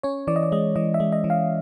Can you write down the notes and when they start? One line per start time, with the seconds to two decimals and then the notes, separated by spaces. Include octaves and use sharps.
0.03 C#4 C#5
0.27 E3 D5
0.36 D#5
0.43 D5
0.52 G#3 D#5
0.76 E3 D#5
0.94 E5
1.00 G#3
1.12 D#5
1.24 E3
1.30 F5